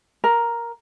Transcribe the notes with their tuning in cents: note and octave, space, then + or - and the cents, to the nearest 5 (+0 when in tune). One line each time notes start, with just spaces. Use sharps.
A#4 +5